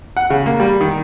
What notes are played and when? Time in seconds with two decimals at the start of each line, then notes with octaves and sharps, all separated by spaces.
0.17 F#5
0.30 C#3
0.46 A#3
0.60 G3
0.81 D#3